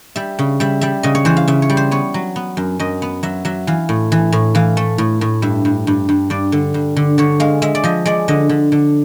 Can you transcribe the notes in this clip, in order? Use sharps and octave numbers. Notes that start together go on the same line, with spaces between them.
G3 E5
C#3
G3 E5
G3 E5
C#3 D#5
C#5
E3 C5
F5
C#3 E5
C#5
G3
C5
B3 C#5
F#3
B3
F#2
F#2 D#5
B3
F#3 E5
F#3 E5
E3 F5
A2
E3
A2
E3 F5
A3
A2
A2
G2 E5
G2
G2
G2
G2 D5
D3
G2
D3
D3 C#5
G#3 F5
G#3 E5
D5
F3 D#5
G#3 D5
D3 D#5
D3
D3